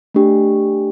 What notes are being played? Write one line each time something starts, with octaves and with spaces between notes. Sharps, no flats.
A3 D4 G4